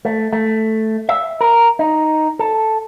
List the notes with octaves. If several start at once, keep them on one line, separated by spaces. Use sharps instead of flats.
A3
A3
E5
A#4
D#4
A4